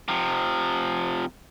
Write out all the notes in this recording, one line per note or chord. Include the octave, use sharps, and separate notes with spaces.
C3 F3